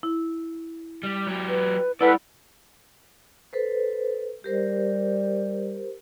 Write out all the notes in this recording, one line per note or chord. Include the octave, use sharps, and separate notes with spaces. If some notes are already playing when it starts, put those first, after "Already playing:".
E4
G3
F#3 G4
B4
G#3 E4 A4 B4 D5 F#5 B5
A4 B4 C5
G3 G4 A#4 C5